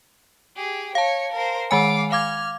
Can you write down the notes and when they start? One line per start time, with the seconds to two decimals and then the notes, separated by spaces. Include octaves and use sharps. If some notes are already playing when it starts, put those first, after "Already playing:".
0.56 G4 G#4
0.95 C#5 F5 A5 C#7
1.33 A#4 C5
1.71 D#3 G#3 F5 G#5 D6
2.12 F5 D6 F6 G#6